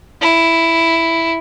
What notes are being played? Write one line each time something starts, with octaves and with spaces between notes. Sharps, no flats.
E4